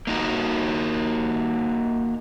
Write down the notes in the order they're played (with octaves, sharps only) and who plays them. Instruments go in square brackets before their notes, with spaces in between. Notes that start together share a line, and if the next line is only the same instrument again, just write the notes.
[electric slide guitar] A#3 D#4 F#4 A#4